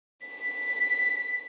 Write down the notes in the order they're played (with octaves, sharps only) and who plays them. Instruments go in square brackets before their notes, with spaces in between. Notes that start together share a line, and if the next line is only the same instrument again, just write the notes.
[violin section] B6